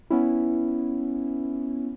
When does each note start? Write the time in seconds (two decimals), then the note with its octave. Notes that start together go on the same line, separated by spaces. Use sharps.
0.10 B3 C#4 E4